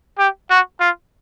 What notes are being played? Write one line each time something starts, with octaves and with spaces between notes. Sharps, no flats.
G4
F#4
F4